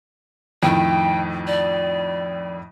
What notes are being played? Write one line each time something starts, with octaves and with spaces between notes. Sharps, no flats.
F2 A2 D#3 G5
D5